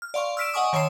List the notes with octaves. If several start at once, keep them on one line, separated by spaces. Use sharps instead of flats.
F6
D5 F5 C6 C#6
E6 F6 B6 D7 E7
D#5 F#5 G#5 C#6 D#6
D#3 C#5 C6 D#6 C7 E7